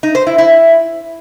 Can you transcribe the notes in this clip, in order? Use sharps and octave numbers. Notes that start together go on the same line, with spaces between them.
D#4
C5
E4
E4